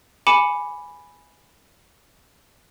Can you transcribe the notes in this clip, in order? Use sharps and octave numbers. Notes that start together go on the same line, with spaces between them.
G#5 B5 D6 C#7 E7